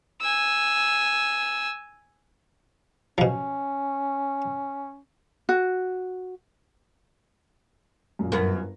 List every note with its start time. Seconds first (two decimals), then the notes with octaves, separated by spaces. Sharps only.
0.21 G#5 E6
3.18 B2 F3 C#4
5.49 F#4
8.19 F#2 A#2
8.32 G1 F#2 B3 A#4